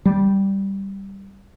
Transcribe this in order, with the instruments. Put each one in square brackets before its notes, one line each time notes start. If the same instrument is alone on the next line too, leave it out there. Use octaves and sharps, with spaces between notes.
[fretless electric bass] G3